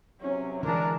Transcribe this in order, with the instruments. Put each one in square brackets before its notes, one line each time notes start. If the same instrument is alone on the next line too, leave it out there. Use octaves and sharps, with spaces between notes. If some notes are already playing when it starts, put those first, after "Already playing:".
[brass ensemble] B1 C3 F#3 [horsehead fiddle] C#4
[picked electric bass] D3 E3 [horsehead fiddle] G#3 A#4 [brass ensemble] D4